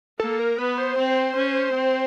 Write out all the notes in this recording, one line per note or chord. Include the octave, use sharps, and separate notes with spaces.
A#3 A4
A#4
B3 B4
C5
C4
C#4
C4